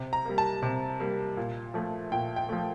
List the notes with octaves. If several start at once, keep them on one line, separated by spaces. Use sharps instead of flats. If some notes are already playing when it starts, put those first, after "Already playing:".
Already playing: C3
A#5
G3 A#3
A5
C3
G3 A#3
A#2
F3 A3
A#2 G5
G5
F3 A3